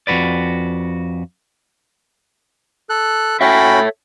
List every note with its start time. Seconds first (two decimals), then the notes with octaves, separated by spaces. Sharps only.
0.07 F2 A#2 F#4 B4 D5
2.90 A4 F#6
3.41 C#4 F#4 A4 C#5 E5 G5 B5